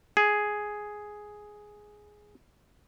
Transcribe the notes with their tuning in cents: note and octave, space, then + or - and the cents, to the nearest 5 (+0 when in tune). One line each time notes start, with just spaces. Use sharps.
G#4 +5